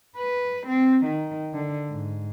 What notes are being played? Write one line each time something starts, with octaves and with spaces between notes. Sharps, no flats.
B4
C4
D#3
D3
G#2